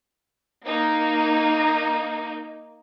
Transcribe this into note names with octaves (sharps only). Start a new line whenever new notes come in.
A#3 D#4